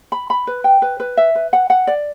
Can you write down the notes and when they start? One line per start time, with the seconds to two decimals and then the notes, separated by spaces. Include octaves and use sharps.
0.12 B5
0.30 B5
0.47 B4
0.64 G5
0.82 B4
1.00 B4
1.17 E5
1.35 B4
1.53 F#5
1.70 F#5
1.87 D5